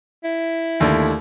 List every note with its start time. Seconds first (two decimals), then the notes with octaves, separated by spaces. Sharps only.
0.24 E4
0.80 D#2 D3 A3